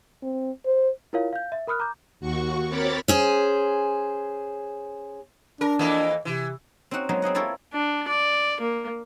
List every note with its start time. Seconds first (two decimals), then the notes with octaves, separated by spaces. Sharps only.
0.23 C4
0.66 C5
1.13 E4 F4 A#4 C#5 F5
1.33 F5 G6
1.52 E5
1.67 A#4 B5 D#6 F6 F#6
1.80 A#5 D6 G6
2.20 D#2 F#4 C#6
2.69 C4 A#4 C#5 B5 D6 A6
3.08 C#4 G#4 C5
5.61 D4 A#4
5.79 F2 E3 A#3
6.25 C3 E3
6.91 C4 C#4 D#4 F#4 F#5
7.09 F#3 G#3 A#3 B3 D#4
7.22 C4 G#4 D#5 F#5
7.35 C4 E4 F4 A4 A#4 C#5
7.73 D4
8.08 D5
8.61 A#3